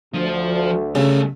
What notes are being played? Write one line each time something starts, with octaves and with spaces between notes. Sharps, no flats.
D2 F3 C5
C#3 G3 A3